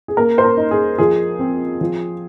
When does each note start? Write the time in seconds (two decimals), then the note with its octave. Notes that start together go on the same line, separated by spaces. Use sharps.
0.08 G#4
0.17 A#3 A#4
0.38 C5
0.44 A#4
0.57 D#4
0.71 G#4
0.98 F3 G#4
1.39 C4
1.81 F3